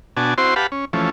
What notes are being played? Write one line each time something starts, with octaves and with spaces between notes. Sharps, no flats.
B2 D4 F#4 G#5 A5
C4 E4 F#4 C5 C6
G4 B4 F5 F#5 A5 B5
C#4
E3 F3 A3 C#4